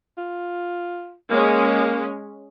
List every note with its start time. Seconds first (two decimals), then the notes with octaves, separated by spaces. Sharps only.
0.18 F4
1.31 G#3 A#3 C#4